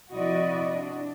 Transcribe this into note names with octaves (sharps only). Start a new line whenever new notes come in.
C3 F3 E4 F#4 D5 D#5
D4